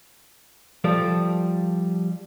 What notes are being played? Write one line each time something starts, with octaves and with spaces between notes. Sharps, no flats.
F3 G3 A4 D5